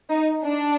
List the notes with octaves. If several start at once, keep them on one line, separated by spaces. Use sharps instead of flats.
D#4
D4